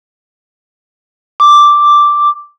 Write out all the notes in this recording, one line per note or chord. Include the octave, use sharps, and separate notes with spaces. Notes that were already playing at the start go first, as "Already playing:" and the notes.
D6